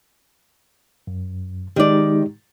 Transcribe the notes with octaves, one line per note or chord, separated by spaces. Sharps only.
F#2
D#3 G#3 D#4 G4 D5